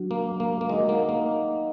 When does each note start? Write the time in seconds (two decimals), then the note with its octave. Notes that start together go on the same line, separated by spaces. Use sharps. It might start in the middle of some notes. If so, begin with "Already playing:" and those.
Already playing: F#3 D4 F#4
0.11 A#3
0.40 A#3
0.61 A#3
0.69 G#3 D#4 A#4 D#5 F#5
0.89 A#3
1.09 A#3